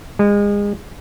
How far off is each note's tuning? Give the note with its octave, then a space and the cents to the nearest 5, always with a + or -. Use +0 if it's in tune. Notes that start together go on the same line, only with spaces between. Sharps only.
G#3 -30